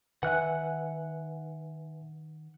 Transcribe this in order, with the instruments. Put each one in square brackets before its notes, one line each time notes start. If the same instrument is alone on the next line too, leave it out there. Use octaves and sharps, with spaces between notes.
[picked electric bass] D#3 [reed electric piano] B4 E5 G#5 [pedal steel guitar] F#5 F#6